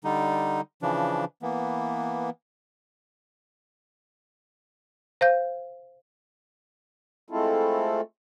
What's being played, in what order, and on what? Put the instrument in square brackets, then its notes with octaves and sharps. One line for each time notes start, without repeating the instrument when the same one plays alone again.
[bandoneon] D3 G3 D#4
C#3 E3 F3 D4
E3 A#3 B3
[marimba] C5 F5 G6
[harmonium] G#3 A3 C4 E4 F4 A4